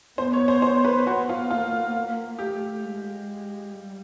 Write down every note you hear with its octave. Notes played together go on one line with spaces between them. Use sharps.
B3 C5
C#5
C5
C5
B4
B3 F#4
F4
A#3 F4
A3 G4
G#3
G3